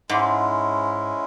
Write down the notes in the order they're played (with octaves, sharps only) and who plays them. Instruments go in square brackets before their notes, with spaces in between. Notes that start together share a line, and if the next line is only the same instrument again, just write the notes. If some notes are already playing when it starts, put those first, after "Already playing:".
[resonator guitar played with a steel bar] G#2 [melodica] G#3 C#4 E4